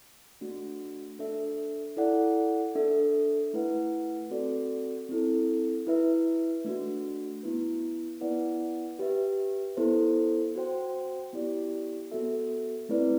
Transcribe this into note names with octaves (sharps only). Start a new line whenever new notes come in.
A3 D4 F#4
D4 A4 E5
E4 A4 D5 F#5
D4 A4 E5
A3 E4 B4 F#5
C4 F#4 A4 D5
C4 E4 A4
E4 B4 E5
A3 D4 F#4
B3 E4 B4
B3 E4 B4 D5 F#5
G4 B4 E5
B3 E4 A4 C5
F#4 C5 G5
B3 E4 G4 D5
B3 F#4 A4 E5
A3 C4 E4 B4 D5